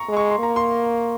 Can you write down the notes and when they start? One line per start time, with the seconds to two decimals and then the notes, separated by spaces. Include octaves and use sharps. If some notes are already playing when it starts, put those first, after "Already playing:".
Already playing: A#5 C#6
0.09 G#3
0.17 C#6
0.30 C6
0.39 A#3 A#5
0.56 C6